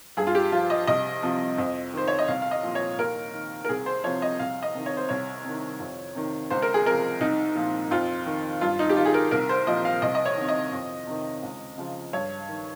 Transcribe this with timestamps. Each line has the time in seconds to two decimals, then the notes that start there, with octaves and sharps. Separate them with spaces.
0.17 G2 G#4
0.27 F4
0.35 G4
0.52 F3 F4
0.70 D#5
0.87 C2 D#5
1.23 C3 F3
1.58 F2
1.94 D#3 C5
2.08 C#5
2.19 D#5
2.28 C2 F5
2.42 F5
2.51 D#5
2.63 A#2 F3
2.75 C#5
2.99 D#2 A#4
3.34 D#3
3.65 A#4
3.69 C2 G#4
3.86 C5
4.04 C3 F3 C#5
4.22 D#5
4.39 C2 F5
4.63 D#5
4.74 C3 D#3
4.86 C#5
4.97 C5
5.09 C2 C#5
5.45 C3 D#3
5.80 F2
6.15 C3 D#3
6.50 C#2 C5
6.62 A#4
6.74 G#4
6.86 C3 F3 A#4
7.20 C2 D#4
7.55 A#2 F3
7.91 F2 F4
8.26 D#3
8.61 G2 F4
8.79 D#4
8.89 G4
8.97 D#3 F4
9.05 G#4
9.14 A#4
9.31 C2 A#4
9.49 C5
9.67 A#2 F3 D#5
9.85 F5
10.02 C2 D#5
10.15 D#5
10.26 C#5
10.37 C3 D#3
10.49 D#5
10.73 F2
11.07 C3 D#3
11.43 C#2
11.78 C#3 F3
12.13 G2 C#5
12.48 D#3